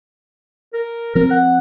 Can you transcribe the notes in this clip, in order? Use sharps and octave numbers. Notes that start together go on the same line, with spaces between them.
A#4
F3 C4 A#4
F#5